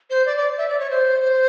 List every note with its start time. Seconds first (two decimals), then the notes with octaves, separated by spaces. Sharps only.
0.10 C5
0.26 D5
0.37 D5
0.58 E5
0.69 D5
0.79 C#5
0.90 C5